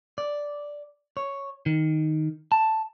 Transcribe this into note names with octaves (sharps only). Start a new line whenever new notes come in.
D5
C#5
D#3
A5